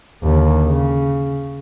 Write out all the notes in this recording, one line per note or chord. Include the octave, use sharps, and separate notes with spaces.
D#2 D3
C#3